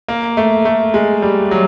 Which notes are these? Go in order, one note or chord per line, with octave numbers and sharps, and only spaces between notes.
A#3
A3
A3
G#3
G3
F#3